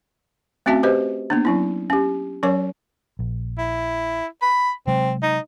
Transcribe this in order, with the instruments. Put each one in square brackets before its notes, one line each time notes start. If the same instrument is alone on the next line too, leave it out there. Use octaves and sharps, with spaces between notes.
[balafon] A3 C4 C#4 F#4 E5 A5
G4 B4 C5 D#5
A#3 B3 D4
F#3 C#4 E4
C#4 G4
F#3 C#4 A#4 C#5 D6
[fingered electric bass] A#1
[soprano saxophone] E4
B5
[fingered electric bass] C3 F#3 G#3 [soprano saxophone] C4
[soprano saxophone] D#4